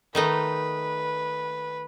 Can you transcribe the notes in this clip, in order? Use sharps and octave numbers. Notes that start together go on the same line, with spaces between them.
D#3 A3 D#4 B4